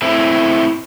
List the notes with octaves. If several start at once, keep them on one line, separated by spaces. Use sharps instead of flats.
A2 C4 E4